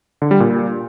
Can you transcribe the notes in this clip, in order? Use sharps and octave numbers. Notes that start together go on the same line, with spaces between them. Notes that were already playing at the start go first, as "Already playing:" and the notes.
D3
G3
A#2